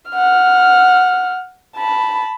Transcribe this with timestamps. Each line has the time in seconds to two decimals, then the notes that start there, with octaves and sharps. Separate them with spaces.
0.11 F#5 F6
1.77 A5 B5